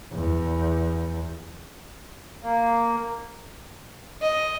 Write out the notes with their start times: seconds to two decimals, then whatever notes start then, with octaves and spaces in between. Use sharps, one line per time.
0.13 E2
2.43 A#3
4.22 D#5